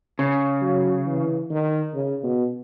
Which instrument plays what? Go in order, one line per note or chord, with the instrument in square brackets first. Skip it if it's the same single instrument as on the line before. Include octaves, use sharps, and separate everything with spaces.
[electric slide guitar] C#3
[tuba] F#3
E3
D#3
C#3
B2